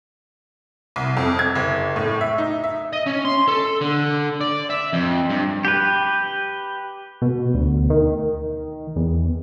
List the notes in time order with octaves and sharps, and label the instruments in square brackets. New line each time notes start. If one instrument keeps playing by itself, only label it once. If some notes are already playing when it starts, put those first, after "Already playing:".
[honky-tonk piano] C2
F2
G#6
F#1
A2
E5
D#4
E5
[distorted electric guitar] D#5
C#4
C6
A4
D3
D5
E5
F2
G2
[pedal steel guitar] G4 B4
[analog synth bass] B2
D2
D#3
E2